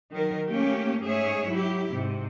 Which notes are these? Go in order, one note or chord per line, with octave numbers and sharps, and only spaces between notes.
D#3 F#3 A#4
A3 A#3 C#4 G4 C#5
G#2 A3 G#4 C#5 E5
F#3 E4 G4
G#2 C3